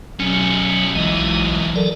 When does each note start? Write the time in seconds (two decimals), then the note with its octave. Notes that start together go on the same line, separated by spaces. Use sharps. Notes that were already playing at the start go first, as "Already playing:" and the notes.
0.20 B1 F#3 C#4
0.95 A#1 E3 F#3 G#3 D#5
1.76 A4 A#4 D5